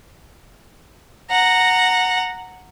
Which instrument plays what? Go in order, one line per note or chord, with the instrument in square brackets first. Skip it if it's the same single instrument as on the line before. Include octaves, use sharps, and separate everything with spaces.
[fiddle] F#5 A#5